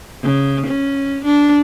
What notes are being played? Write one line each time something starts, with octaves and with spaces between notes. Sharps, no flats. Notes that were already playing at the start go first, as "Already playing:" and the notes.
C#3
C#4
D4